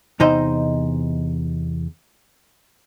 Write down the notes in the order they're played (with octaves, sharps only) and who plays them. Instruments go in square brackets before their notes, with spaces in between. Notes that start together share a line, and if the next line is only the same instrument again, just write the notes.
[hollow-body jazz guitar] E2 C3 D#4 C5 D#5